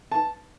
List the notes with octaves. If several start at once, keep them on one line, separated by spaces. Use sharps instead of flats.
A5